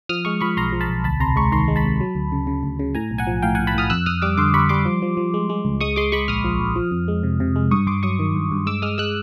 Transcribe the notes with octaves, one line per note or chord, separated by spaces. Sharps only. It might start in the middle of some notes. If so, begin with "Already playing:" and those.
F3 D#6 F6
G#3 C#6 D#6
F3 B5 C#6
B1 A#5 C6
F3
A5 B5
B1
D2 A5 B5
C3 A#5 C6
G#3 B5 C#6
D#3 A#5 C6
G#3
A5 B5
C3
F#3
D2
C#3
C#3
D2
C#3
A2 G#5 A#5
B1
F#5 G#5
F3
A2 F5 G5
A2 F#5 G#5
A5 B5
A2 D#6 F6
F2 E6 F#6
F2 D#6 F6
G3 D6 E6
D3 C6 D6
G3 B5 C#6
G3 C6 D6
F3
F3
F3
G#3
G#3
C#2
G#3 C#6 D#6
G#3 C6 D6
G#3 B5 C#6
A#1 D#6 F6
F3
A#1
F3
F2
G#3
C3
C3
G#3
G2 C#6 D#6
G2 C6 D6
F#3 C#6 D#6
D#3
G2
G2
G#3 D6 E6
G#3 D#6 F6
G#3 E6 F#6